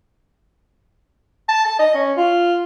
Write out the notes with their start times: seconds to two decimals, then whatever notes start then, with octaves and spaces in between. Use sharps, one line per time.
1.48 A5
1.65 A5
1.79 D#5
1.95 C#4
2.17 F4